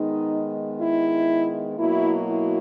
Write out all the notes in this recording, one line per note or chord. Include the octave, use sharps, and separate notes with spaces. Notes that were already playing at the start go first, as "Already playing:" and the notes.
Already playing: D#3 G#3 B3 D#4
E4
B2 F#3 A#3 E4
E4